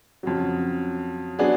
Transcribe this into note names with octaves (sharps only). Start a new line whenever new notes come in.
F2 C#3 F#3
F#3 B3 D4 G#4